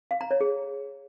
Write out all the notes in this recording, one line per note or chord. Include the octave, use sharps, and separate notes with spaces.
F5
A#5
C#5
G#4